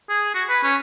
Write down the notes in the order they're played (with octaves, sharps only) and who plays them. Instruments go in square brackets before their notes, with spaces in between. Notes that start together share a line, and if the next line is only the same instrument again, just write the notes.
[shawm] G#4
F#4
B4
C#4